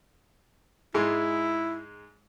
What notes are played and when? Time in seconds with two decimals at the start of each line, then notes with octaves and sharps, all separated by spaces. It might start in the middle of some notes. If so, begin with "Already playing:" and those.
0.94 G#2 G#3 E4